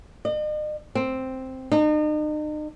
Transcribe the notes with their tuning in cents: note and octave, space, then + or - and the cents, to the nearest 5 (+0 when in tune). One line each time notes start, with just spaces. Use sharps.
D#5 -45
C4 +0
D#4 -40